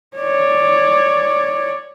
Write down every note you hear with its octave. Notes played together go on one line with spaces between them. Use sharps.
C#5 D5